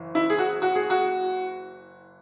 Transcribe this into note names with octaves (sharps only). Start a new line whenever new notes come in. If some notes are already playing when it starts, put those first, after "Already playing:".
Already playing: F#1 E3
E4
G#4
F#4
F#4
G#4
F#4